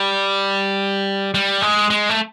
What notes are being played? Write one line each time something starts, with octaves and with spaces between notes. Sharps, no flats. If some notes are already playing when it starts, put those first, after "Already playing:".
Already playing: G3
G3
G#3
G#3
A3